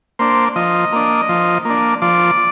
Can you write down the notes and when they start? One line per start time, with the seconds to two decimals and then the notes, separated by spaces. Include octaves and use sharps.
0.19 A#3 D4 C5
0.56 F3 D#5
0.92 A#3 D4
1.29 F3
1.65 A#3 D4
2.02 F3 D5